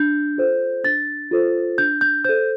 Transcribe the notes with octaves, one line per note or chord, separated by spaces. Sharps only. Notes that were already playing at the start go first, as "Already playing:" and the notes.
Already playing: D4 G6
F4 A4 C5
D4 A6
F4 A4 C5
D4 G6
G6
A4 C5 G6